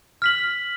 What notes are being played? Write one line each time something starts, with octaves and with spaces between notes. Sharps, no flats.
F6 B6 F#7